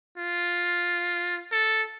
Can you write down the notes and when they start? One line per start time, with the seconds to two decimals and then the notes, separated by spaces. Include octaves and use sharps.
0.18 F4
1.52 A4